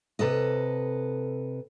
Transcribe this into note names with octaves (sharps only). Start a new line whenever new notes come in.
C3 A4 B4 D#5